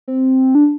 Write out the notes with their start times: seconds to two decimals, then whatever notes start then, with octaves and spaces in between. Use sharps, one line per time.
0.08 C4
0.55 D4